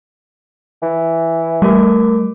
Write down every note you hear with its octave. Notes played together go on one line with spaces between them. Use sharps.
E3
G3 A3 A#4 D6